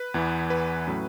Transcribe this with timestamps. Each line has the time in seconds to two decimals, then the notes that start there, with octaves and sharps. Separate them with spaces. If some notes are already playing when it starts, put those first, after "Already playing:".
Already playing: B4
0.14 E2 E3 B3
0.50 B4
0.87 A2 F#3 C#4